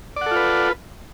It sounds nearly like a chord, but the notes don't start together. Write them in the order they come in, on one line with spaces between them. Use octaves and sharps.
D5 F#5 A4 F4 B4